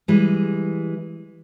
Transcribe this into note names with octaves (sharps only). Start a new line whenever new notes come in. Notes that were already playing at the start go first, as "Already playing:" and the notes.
E3 G3 G#3